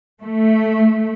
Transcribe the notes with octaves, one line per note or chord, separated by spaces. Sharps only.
A3